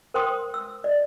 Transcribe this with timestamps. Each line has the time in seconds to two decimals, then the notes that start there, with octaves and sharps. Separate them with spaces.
0.14 A#4 C5 G5 C6 D#6
0.54 E6
0.84 D5 D#5